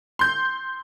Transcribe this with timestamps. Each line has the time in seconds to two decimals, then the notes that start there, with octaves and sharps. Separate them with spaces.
0.19 C6 G6